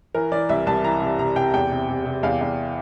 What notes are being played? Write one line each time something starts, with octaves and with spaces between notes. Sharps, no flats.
E3 A#4
E3 D5
C2 E5
C2 A5
E3 A#5
C3
C3 A#5
C3 G5
E2 G5
C3
C3
C3
E2 F5
E2